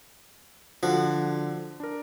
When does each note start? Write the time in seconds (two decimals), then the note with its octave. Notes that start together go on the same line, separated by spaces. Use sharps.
0.83 D3 F3 F#4
1.80 D4 A#4